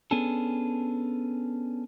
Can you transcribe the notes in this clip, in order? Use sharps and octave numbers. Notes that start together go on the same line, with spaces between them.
B3 C#4 D4 G#4 A4